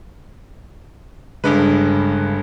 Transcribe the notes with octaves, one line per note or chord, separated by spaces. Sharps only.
G1 G2 C#3 G#3 D4 B4